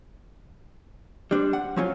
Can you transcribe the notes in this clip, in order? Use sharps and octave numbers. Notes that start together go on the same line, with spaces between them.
G3 D4 C5
F#5
F3 F#3 C#4 F4